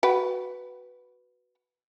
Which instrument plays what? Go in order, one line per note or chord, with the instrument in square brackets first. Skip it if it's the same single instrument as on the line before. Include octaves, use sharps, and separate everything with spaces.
[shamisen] F#4 B4 G5